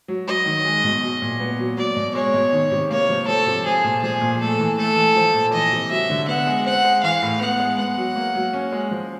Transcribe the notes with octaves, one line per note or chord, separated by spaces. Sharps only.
F#3
F#3 D#5
D#3
G#3
B2
F#3
A#2
B3
F#3
F#3 D5
B2
G#3 C#5
B2
D#3
C3
A#3 C#5
F3
F3 A4
C3
F3 G#4
A#2
F3 G#4
A#2
A3 A4
E3
A3 A4
E3
F3
A#2
E3 D#5
C3
F#3 E5
D3
B3 F#5
G#3
C4 F#5
G#3
E3 F5
A2
B3 F#5
G#3
B3 F#5
F#3
A#3
F#3
C#4
G#3
F3